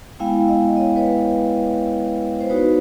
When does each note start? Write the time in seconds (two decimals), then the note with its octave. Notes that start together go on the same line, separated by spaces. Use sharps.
0.20 G#3 B3 E4 F5 G5
0.48 D#5 F5
0.77 C#5 D#5
0.96 B4 C#5
2.41 C5
2.49 B3 D#4 F#4 B4 C#5